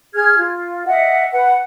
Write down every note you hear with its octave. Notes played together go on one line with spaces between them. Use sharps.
G#4 F6 G#6
F4
D#5 E5 F#5
B4 F#5